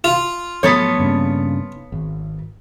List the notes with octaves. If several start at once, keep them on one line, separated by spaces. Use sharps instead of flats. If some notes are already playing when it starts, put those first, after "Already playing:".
F4
A2 F3 F#3 B3 A4 C#5
G2 C#3 A#3
G#1